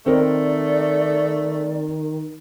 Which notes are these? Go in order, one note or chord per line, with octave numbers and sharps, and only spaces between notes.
D#3 A3 C4 A#4 D5